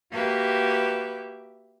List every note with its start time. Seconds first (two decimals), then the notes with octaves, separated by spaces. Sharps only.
0.12 A#3 F#4 G4 B4 E5